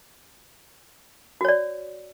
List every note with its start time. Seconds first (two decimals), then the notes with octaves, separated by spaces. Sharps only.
1.41 F#4
1.45 C#5
1.48 D5